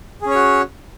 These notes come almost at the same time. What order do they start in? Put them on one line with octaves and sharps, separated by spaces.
G#4 C#4 C#5 F#4